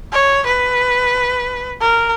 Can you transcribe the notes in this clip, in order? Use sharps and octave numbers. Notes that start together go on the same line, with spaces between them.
C#5
B4
A#4